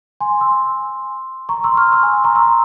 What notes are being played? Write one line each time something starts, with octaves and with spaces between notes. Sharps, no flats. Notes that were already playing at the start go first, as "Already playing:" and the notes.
G#5 C6
C6 E6
A#5 C#6
C6 E6
C#6 F6
C6 E6
G#5 C6
A#5 C#6
C6 E6